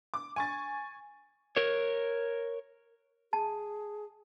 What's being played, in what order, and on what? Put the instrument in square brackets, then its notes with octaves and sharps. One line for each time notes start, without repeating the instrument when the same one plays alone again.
[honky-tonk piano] D6
G#5 C#6 A6
[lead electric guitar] A#4 C#5
[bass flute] G#4 [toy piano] A5